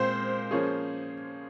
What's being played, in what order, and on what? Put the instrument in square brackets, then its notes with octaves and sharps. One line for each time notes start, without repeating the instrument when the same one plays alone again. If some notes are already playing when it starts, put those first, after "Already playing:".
Already playing: [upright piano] A#2 G#3 C4 [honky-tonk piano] C5
[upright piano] F3 A#3 C#4 G#4